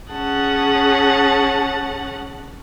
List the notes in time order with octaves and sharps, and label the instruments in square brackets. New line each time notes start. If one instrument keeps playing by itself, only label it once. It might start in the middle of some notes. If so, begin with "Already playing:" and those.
[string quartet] C#4 G#4 F#5 A5